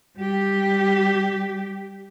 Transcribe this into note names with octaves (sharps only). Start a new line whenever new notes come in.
G3 G4